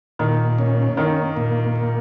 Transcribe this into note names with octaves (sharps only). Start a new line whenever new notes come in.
A#2 D#3
C#4
D#3 A#3
A#2
A#3